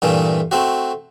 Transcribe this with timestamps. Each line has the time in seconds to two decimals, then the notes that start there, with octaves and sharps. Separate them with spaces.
0.02 G2 A#2 E3 A3
0.51 A3 C4 F#4